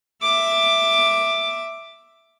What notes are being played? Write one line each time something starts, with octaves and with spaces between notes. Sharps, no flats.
E5 D6